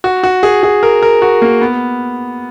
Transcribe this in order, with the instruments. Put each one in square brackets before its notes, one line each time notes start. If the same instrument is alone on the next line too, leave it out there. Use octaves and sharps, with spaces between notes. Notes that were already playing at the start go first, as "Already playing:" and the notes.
[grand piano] F#4
F#4
G#4
G#4
A#4
A#4
F#4
A#3
B3